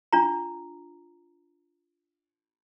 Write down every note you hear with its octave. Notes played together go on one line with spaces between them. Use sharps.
D4 F4 A#5